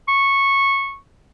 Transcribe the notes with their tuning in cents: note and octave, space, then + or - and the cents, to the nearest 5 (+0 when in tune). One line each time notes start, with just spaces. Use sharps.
C#6 -10